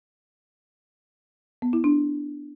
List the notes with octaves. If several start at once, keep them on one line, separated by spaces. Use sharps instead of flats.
B3
E4
D4